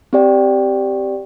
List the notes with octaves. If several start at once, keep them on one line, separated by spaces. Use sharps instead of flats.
C4 G4 D5 G5